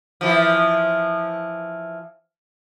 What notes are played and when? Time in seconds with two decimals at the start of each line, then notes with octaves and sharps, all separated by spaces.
0.21 E3 F3